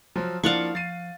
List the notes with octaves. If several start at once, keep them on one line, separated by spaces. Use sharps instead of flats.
F3 F#3 C5 F6
F3 A#3 D4 E4 F5 F#5 C#6
F3 A6 C7 D#7